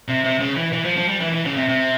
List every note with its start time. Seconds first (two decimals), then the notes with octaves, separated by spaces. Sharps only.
0.08 C3
0.24 C3
0.40 C#3
0.56 E3
0.73 E3
0.85 F3
0.97 F3
1.08 G3
1.20 E3
1.32 E3
1.45 C#3
1.56 C3
1.69 C3